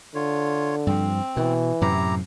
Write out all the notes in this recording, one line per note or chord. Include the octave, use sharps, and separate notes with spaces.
D3 F4 C#5
G2 F3 C4
B2 E3
F#2 A2 C3 E4 G4 A#5